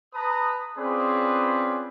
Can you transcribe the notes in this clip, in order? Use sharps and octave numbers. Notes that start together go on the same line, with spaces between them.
B4 A5 A#5 D#6
C4 C#4 F4 G#4 B4 D5